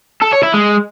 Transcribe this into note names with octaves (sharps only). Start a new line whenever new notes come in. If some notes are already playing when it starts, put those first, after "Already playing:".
A4
C#5
E4
G#3